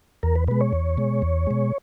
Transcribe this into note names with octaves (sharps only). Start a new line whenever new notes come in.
E2 A#4
B4
B2 G#3 B4
C#5
E2
B2 G#3
E2
B2 G#3